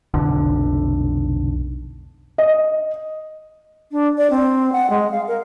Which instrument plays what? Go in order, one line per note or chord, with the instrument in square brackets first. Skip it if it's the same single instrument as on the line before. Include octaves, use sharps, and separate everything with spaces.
[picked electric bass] F1 B1 D3
[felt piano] D#5
[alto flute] D4
D5
C4
F#5
G#3
F5
A#4